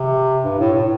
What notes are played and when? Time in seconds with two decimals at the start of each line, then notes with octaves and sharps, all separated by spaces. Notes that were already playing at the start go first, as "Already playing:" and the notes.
Already playing: C3
0.43 G2
0.59 A2
0.73 A2